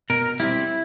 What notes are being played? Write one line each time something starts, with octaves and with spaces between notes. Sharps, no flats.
B2 A#4
G3 C4 E4